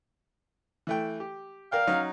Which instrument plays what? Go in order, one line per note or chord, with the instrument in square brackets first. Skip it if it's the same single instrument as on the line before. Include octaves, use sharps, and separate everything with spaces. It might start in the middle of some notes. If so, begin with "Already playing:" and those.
[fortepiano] E3 A3 G5
G4
[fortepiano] A#4 D5 G5 [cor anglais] F5
[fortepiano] F#3 C#4 D#4